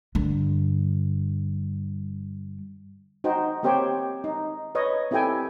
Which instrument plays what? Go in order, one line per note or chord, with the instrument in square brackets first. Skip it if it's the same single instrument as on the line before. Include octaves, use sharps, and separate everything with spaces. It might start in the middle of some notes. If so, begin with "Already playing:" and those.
[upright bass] G2 D3
[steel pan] D#4 F#4 C5 G5
A#3 C4 G4 C5 C#5 G5
D#4
B4 C#5 D#5
C4 E4 G4 A4 G5 G#5